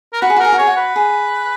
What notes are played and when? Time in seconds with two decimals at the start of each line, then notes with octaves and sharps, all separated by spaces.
0.13 A#4
0.21 F#4 B4
0.30 G#4
0.36 F#4
0.40 G#4 A#4
0.52 F#4
0.58 G#4 C#5
0.67 F#4
0.77 B4
0.96 G#4